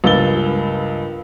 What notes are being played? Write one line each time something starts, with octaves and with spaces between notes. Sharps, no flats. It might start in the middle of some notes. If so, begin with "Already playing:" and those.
C#2 G2 A#3 E6 A6 G7